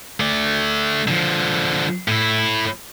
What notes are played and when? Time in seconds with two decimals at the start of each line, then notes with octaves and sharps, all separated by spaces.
0.20 A3 D5
1.08 D3 F3
2.08 A2 E4